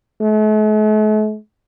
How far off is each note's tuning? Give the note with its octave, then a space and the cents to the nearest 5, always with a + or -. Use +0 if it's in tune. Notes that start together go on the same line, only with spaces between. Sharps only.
A3 -45